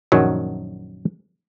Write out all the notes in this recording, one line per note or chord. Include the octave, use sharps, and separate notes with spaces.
A#1 F#2 D#3 F#3